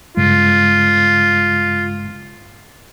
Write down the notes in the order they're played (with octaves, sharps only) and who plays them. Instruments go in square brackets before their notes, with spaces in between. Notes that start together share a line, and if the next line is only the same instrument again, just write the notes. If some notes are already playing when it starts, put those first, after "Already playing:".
[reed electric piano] G2 C#3 G#3 [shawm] F4